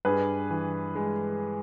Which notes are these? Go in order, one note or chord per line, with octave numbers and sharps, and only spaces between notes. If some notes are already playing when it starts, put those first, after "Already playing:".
G2 G#4 B4
E3
G#3